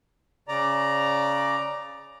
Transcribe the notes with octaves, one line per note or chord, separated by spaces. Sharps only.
C#3 D5 A#5